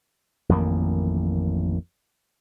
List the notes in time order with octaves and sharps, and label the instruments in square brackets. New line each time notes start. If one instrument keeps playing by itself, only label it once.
[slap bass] A1 F2 D#3 A#3